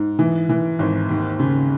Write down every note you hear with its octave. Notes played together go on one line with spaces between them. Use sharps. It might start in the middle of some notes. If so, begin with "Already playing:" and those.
Already playing: G#2
E3
E3
G#1
D#2
C#3